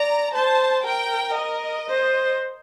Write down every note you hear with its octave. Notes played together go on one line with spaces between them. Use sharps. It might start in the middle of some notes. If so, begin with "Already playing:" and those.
Already playing: D5 A#5
C5 A5
A#4 G5
D#5
C5